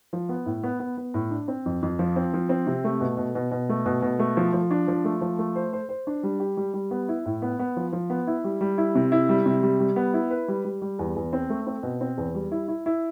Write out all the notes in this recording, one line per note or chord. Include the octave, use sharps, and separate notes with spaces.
F3
B3
A2
B3
B3
B3
A2
D4
C4
F2
F2
F3
C4
F3
C4
C3
A3
B2
B2
B2
B2
A3
B2
B2
A3
F3
F3
D4
F3
A3
F3
A3
C5
C5
C5
D4
G3
G4
G3
G3
B3
E4
A2
B3
B3
F3
F3
B3
E4
G3
G3
E4
C3
E4
G3
C3
G3
G3
B3
E4
B4
G3
G3
G3
E2
E2
C4
A3
C4
B2
C4
E2
G3
E4
E4
E4